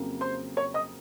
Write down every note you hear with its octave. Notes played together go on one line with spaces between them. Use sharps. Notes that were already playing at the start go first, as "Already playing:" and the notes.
Already playing: F2 C#3 F#3 A#3
C5 C6
C#5 C#6
D#5 D#6